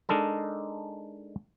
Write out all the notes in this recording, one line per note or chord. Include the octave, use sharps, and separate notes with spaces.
G#3 D4 D#4 A4 A#4